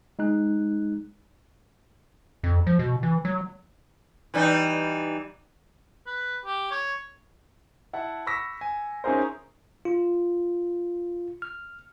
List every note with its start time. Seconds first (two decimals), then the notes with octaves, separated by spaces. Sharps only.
0.19 G#3 D#4 F#6
2.44 F2
2.67 F3
2.79 B2
3.03 E3
3.25 F#3
4.34 E3 G3 D#4
6.07 B4
6.45 G4
6.71 C#5
7.93 E4 F#5 A5
8.27 B5 C#6 D6 E6 A#6 B6
8.61 G#5
9.04 C#4 D#4 E4 G#4 A#4 C5
9.85 F4
11.42 F6